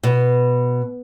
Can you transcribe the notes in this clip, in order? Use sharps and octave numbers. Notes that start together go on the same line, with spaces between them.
B2